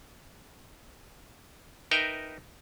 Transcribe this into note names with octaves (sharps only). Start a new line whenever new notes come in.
D#4 A#4 B4 E5 G5